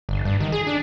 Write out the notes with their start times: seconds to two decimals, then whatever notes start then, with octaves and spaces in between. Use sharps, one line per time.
0.09 G1
0.25 G2
0.40 D#3
0.52 G#4
0.67 D4